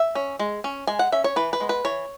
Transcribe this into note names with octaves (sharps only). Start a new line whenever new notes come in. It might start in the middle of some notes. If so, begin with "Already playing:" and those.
Already playing: E5
C#4
G#3
C#4
G#3 G#5
F#5
C#4 E5
C#5
E3 B4
B4
G#3 B3
B4
E3 C#5